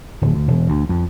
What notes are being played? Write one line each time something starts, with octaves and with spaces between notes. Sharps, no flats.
D1
D2
E1
D2
F2